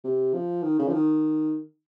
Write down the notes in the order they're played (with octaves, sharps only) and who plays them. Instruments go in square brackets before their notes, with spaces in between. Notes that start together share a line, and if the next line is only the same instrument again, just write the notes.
[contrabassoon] C3
F3
D#3
C#3
F3
D#3